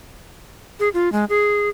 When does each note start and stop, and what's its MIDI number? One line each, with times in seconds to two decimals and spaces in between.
0.80 0.89 68
0.94 1.11 65
1.12 1.25 56
1.30 1.69 68